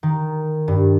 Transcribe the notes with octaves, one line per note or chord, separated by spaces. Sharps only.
D#3
G2